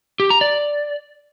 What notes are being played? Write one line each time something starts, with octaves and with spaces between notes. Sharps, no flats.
G4
A#5
D5